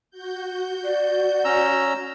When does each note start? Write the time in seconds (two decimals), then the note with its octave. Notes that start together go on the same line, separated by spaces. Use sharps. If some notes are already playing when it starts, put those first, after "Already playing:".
0.11 F#4 G6
0.84 D5
1.45 C#4 A#5 E6